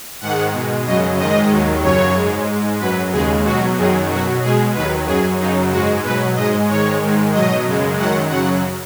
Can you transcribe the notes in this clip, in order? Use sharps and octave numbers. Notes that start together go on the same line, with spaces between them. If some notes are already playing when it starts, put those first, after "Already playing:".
G#2 D#3 G#3 F#5
B2 G#3
F#2 C#3 F#3 D#5
G#2 D#3 G#3 D#5
D#2 D#3 F#3
F#2 C#3 F#3 C#5
G#2 G#3
G#2 G#3
F#2 F#3 B4
D#2 C#3 G#3 G#4
B2 F#3 F#4
F#2 D#3 F#3 G#4
B2 F#3 F#4
B2 G#3 G#4
D#2 D#3 F#3 B4
F#2 F#3 G#4
F#2 C#3 F#3 D#4
G#2 G#3 F#4
B2 F#3 B4
G#2 G#3 D#5
G#2 D#3 G#3 C#5
G#2 D#3 G#3
B2 F#3 D#5
F#2 C#3 G#3
F#2 D#3 F#3 F#5
F#2 C#3 F#3 F#5